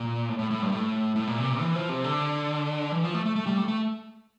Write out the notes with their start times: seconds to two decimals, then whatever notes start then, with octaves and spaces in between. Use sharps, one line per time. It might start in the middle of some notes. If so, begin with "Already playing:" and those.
Already playing: A#2
0.29 A2
0.39 A2
0.51 A2
0.62 G2
0.72 A2
1.16 A2
1.27 A#2
1.38 C3
1.50 A#2
1.60 E3
1.75 F3
1.89 C3
2.04 D3
2.92 E3
3.03 F3
3.14 A3
3.25 A3
3.36 A3
3.46 G3
3.58 A3
3.68 A3